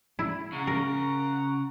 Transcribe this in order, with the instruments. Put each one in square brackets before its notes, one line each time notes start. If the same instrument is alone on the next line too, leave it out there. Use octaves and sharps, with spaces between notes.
[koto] E4
[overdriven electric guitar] C#3 [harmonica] F#5 A#5
[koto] A#4